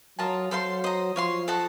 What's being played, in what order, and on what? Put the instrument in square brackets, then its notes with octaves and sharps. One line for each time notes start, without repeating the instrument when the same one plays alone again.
[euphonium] F#3 [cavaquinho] F4 A#4 D#5 A5
[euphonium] F#3 [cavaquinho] A4 C5 F5 C6
[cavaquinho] C5 D#5 A#5
[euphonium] F3 [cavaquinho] C#5 F5 C6
[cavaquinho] A4 D#5 F#5 A5